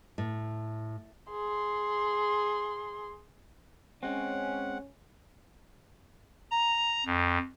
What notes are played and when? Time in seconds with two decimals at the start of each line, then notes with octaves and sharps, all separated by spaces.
0.18 A2
1.31 G#4 C6
4.03 G#3 C4 C#4 F#5
6.51 A#5
7.06 F2